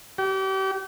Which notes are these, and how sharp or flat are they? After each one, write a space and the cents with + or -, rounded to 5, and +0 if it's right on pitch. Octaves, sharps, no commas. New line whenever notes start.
G4 -35